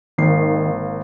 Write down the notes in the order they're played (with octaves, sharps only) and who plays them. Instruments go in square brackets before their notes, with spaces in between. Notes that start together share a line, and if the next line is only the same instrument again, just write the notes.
[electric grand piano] G#1 A#3 C7 [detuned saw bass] D#3